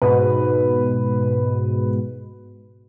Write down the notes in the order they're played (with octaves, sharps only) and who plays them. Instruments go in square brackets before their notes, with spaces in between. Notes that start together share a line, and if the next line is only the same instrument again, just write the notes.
[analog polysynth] G#2 B2 [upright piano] B4